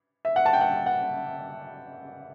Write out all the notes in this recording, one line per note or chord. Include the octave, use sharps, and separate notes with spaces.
E5
F#5
A5
G5
F#5
F#5